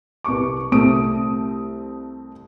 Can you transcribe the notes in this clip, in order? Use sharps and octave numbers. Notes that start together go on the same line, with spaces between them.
C2 B4 C#6 D6
C2 A3 C4 D#6 D7